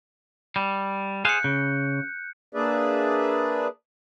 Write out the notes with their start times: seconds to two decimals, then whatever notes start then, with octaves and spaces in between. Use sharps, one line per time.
0.56 G3
1.25 G#4 C5 F5 F#6 G6 C#7
1.44 C#3
2.53 A#3 D4 G#4 B4 D5 E5